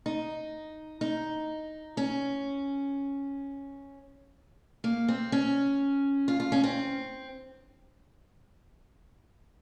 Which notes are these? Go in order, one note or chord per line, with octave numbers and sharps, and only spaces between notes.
D#4
D#4
C#4
A#3
C4
C#4
F4
F4
C#4
C4